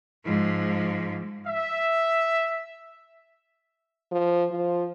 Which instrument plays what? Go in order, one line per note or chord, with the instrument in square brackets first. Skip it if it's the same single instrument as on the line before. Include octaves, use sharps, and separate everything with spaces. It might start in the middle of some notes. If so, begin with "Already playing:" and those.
[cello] G#2 F3
[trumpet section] E5
[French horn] F3
F3